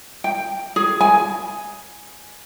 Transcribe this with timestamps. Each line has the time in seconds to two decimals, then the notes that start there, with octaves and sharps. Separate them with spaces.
0.24 G5
0.76 G#4
1.01 G#5